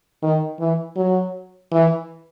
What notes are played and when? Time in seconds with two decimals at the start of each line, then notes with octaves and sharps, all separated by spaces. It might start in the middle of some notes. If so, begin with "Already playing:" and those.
0.23 D#3
0.60 E3
0.96 F#3
1.72 E3